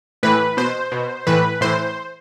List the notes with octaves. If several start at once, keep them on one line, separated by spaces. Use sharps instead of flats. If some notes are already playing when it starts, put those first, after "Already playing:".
A2 E3 B4
B2 C5
B2
A2 E3 B4
A2 E3 C5